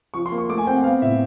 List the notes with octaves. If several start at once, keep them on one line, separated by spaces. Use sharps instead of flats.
F3 C#6
C6
A#3
C#6
A3 D6
G#5
C4 G5
F#5
B3 F5
A2 E5